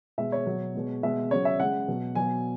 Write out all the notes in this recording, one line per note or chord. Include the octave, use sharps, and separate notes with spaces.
B2 G#3 E5
C#5
B2 F#3
B2 G#3
B2 G#3 E5
C#3 F#3 C#5
E5
C#3 G#3 F#5
B2 F#3
B2 F#3 G#5